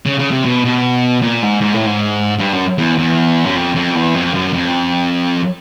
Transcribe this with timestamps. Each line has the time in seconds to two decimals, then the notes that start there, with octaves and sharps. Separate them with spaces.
0.06 C#3
0.19 C#3
0.31 C3
0.45 B2
0.65 B2
1.22 A#2
1.42 G#2
1.61 G#2
1.74 A2
1.86 G#2
2.39 G2
2.53 F#2
2.78 E2
2.98 E2
3.45 F#2
3.55 F2
3.75 F2
3.95 E2
4.14 F2
4.34 F#2
4.53 F2